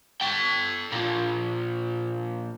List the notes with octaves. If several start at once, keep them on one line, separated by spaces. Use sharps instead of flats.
A4 G5
A#2 F3